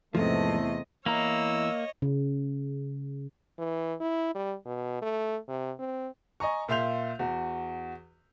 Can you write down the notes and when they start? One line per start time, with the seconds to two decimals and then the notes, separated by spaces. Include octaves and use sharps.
0.15 E2 G#2 C3 F3 A3 D#5
1.06 E2 A#3 E4 C#5 D#5 A#5 E6
2.02 C#3
3.59 E3
4.00 E4
4.35 G3
4.66 B2
5.02 A3
5.49 C3
5.80 C4
6.40 D#5 G#5 A#5 C#6
6.68 A#2 E5 F5 C6 G6 F7
7.19 E2 F#4